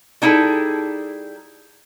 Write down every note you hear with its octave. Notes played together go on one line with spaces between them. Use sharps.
G3 D#4 E4 G#4 A4